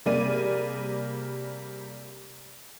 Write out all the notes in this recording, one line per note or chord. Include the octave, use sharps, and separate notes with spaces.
C3 G3 A#3 G#4 D5 D#7